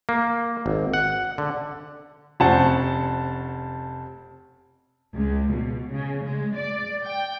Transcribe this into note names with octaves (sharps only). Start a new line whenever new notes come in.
A#3
G#1
F#5
D3
F1 C#4 C5 F#5 A5
C#2
B2
C#3
G#3
D5
G5